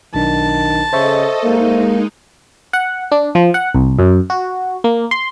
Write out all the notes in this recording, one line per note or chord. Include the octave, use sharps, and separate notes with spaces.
B1 D#3 D4 A5
C#3 A4 C5 D#5 E5 C#6
G#3 A#3 D#4
F#5
D4
F3
F#5
C2
F#2
F#4
A#3
C6